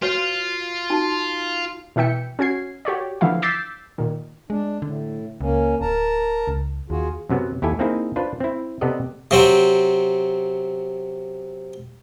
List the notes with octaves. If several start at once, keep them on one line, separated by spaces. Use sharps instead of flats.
F4 F#4 B4 C#5
D#4 F#4 A5
B2 E3 E5 G5 C#7
C#4 F#4 G#6 C7
F#4 G4 C#5 D5
D3 E3 F3 E4 F5
D6 E6 G6 A6 B6 C7
A#2 D#3
G#3 D4
A2 D3
C#2 A#3 C#4
D1 A#4 A5 A#5
C#2
D#2 F4 F#4 G#4
F#2 C3 F#3 B3
D#2 E4 G4 A4 G#5
A#3 C4 D#4 E4 G#4
D4 F4 B4 C5
C4 E4
C3 B3 G4 A4 D5 D#5
C3 F#3 C4